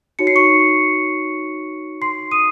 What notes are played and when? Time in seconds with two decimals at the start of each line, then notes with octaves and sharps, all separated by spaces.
0.19 D#4 F#4 C#5 C#7
0.27 C7
0.36 C#6 C#7
2.02 C6 C7
2.31 D#6 D#7